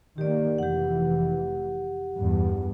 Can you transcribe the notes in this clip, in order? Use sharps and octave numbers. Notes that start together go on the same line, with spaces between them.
D#3 A#3 G4 D5
F1 E3 G4 F#5
E2 G2